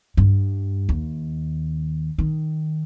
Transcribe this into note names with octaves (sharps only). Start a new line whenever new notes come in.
G2
D#2
D#3